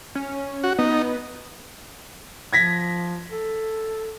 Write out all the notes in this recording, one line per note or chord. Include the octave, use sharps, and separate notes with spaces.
C#4
F#4
B3 D#4
F3 G#6 A#6 B6
A4